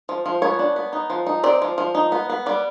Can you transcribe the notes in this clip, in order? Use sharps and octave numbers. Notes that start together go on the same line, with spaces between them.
F3
F3
B3 C#5
D4
B3
D#4
F3
D#4
C4 D5
F3
F3
D#4
B3
B3
G3 D5